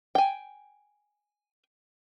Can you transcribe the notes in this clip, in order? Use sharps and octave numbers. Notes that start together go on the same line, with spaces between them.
G5 G#5